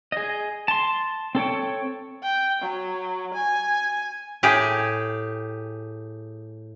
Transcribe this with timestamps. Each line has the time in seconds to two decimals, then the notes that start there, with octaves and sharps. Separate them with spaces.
0.12 G#4 D#5
0.68 A5 C6
1.35 C4 A4 C#5 G5
2.23 G5
2.62 F#3
3.34 G#5
4.43 A2 G4 G#4